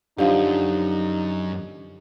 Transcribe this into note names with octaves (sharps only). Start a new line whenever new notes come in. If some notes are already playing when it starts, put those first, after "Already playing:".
F#2 D3 F3 D#4 G4